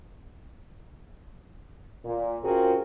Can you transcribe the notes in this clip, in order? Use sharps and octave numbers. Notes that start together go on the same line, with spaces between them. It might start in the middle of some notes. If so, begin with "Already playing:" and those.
A#2
C4 C#4 F4 F#4 G#4 A#4